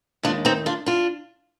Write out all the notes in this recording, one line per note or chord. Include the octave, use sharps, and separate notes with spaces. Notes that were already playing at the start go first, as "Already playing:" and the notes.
D#2 D#3 G#3 D4 F4
C4 D#4
D4 F4
D4 F4